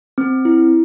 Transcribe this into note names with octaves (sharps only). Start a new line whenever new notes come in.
C4
E4